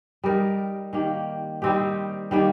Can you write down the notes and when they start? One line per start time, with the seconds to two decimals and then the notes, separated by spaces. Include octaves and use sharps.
0.24 G3 D#4 A#4
0.93 D#3 A#3 G4
1.62 G3 C4 D#4 G4
2.31 D#3 G3 A#3 G4